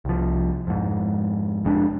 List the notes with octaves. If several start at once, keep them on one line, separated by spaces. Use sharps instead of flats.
C2 F3
F2 G#2
F1 F2 G#3 D4